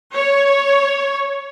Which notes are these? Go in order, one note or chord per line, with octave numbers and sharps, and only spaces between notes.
C#5